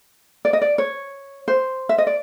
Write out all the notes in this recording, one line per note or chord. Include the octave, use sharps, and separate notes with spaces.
D5
D#5
D5
C#5
C5
E5
D#5
D5